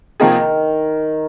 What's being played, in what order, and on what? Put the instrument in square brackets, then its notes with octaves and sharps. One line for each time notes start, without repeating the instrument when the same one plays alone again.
[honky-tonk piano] C3 F3 A#3 G#4 [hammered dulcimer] D#3